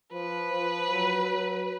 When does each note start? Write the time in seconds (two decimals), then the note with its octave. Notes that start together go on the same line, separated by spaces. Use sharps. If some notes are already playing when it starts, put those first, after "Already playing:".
0.12 F3 B4
0.52 F3
0.92 F#3
1.31 F#3